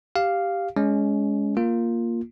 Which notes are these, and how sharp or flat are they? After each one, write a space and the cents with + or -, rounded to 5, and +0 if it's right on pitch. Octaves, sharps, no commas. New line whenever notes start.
G4 +0 F5 +0
G#3 +5 C#4 +25
A#3 +0 F4 +0